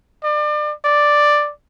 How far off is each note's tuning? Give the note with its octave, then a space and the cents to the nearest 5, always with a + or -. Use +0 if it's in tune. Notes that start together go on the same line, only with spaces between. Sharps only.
D5 +35
D5 +5